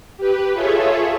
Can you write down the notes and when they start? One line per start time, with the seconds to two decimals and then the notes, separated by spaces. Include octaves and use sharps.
0.18 G4 B4
0.54 F4 G#4 A4 C#5 E5